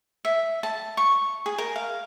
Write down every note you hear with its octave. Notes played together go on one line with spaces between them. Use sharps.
E5
A5
C#6
G#4
A#4
F5